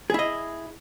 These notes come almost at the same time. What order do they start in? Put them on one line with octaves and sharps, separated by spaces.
G#4 E4 D#5